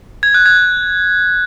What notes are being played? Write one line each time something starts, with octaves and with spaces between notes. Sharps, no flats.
G#6
F#6
G#6